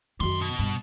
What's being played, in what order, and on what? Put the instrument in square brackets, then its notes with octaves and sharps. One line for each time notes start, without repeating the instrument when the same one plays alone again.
[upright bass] F#2 D#3 [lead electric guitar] D4 C6
[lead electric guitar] B2
[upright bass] G2